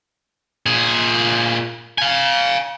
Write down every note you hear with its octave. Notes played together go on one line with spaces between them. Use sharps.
A#2 G#4
F5 G#5